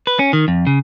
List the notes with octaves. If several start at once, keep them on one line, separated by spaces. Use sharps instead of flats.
B4
C#4
D#3
F2
C#3